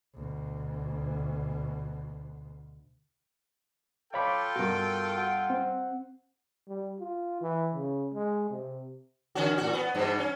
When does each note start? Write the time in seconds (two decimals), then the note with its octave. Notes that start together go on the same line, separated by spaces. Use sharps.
0.14 D2 B2
4.14 F4 A4 C#5 F5 G5 B5 D6
4.56 G2 B2 F#4 A#4
5.18 F#5
5.50 C4
6.68 G3
7.00 F4
7.42 E3
7.75 C#3
8.14 G#3
8.51 C3
9.35 D3 C#4 F#4
9.58 A2 F#4
9.73 B3
9.95 G2 B2
10.19 C#4